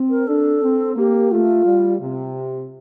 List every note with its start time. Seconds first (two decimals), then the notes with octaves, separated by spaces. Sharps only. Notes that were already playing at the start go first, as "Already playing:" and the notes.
Already playing: C4
0.09 A#4
0.27 D4 A4
0.62 C4
0.96 A#3 G4
1.31 A3 F4
1.65 G3
2.01 C3